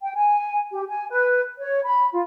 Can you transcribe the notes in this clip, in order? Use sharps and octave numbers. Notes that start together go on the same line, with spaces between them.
G5
G#5
G4
G#5
B4
C#5
B5
F4